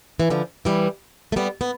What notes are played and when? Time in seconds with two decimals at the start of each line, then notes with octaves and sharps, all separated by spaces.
0.20 E3
0.30 D3 F3
0.65 E3 G3
1.32 A3
1.36 G3 B3
1.61 B3